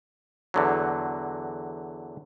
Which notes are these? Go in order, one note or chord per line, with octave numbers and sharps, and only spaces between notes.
E2 D3 F#3